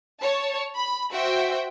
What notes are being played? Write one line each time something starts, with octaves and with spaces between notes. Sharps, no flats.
C#5 A5
B5
F#4 C5 E5 G5